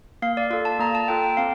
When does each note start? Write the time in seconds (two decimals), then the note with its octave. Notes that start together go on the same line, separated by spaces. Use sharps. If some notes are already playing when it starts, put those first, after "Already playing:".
0.22 A#3 F5
0.37 D5
0.50 F4 A4 D5
0.65 A5
0.80 A#3 A#5
0.95 A5
1.08 F4 A4 G5
1.23 G5
1.37 C4 F5